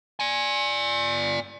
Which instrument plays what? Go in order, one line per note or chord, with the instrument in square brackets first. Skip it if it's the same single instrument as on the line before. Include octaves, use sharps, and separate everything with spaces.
[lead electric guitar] D5 G#5